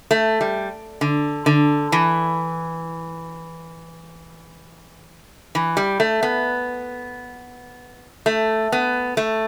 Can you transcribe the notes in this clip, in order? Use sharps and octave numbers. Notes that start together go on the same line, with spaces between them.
A3
G3
D3
D3
E3
E3
G3
A3
B3
A3
B3
A3